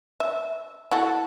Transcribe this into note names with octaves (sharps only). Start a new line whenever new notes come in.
E5
E4 F#4 A4